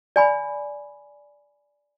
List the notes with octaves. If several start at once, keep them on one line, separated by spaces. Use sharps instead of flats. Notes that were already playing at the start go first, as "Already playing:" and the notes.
D5 G#5 B5